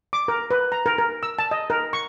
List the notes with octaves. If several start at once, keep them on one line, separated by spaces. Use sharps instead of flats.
D6
A#4
B4
A#5
A#4
A#4
E6
A5
D#5
A#4
C#6